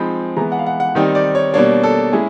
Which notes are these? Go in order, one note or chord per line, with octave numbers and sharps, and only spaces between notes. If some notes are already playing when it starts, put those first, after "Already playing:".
Already playing: F3 G#3 C4 D#4 B5
E3 G#3 B3 A#5
F#5
F5
F#5
F#5
D#3 G3 C4 D#4 G5
D5
C#5
B2 G3 A#3 D4 C#5
A4
G#3 C#4 E4 G#4